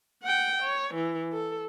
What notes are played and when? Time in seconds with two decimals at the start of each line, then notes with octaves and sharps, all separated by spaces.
0.23 F#5 G5
0.62 C#5
0.94 E3
1.33 A4